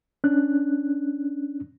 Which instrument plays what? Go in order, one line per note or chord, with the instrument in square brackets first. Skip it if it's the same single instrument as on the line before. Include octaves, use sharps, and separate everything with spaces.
[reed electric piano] C#4 D4 F#6